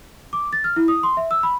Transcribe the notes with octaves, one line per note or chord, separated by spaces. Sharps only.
D6
A6
F6
E4
D#6
C6
E5
E6
B5